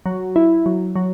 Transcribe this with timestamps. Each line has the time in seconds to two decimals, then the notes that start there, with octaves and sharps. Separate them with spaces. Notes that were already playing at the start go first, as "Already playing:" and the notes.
0.06 F#3
0.36 E4
0.66 F#3
0.96 F#3